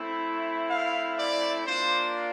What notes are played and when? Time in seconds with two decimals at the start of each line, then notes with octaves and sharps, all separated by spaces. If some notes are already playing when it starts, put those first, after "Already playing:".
Already playing: A3 C4 E4
0.69 F5
1.19 D5
1.67 A#3 D4 F4 C5